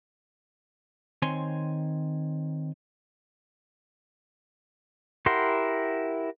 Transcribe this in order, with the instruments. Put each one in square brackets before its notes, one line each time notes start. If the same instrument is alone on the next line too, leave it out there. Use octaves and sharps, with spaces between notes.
[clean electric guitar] D#3 C4 C#5 G#5 C6
[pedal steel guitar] E4 G4 A#4 F#5 C6